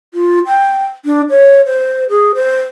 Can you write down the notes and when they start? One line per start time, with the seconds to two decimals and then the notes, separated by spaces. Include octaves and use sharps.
0.14 F4
0.47 G5
1.05 D4
1.30 C#5
1.66 C5
2.10 G#4
2.35 C5